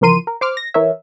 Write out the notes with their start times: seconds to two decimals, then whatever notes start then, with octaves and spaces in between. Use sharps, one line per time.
0.01 C#2 E3 F3 A#4 C6 D#7
0.27 A#4
0.41 C5 D6 F6
0.57 A#6
0.74 E3 A#4 C#5 E5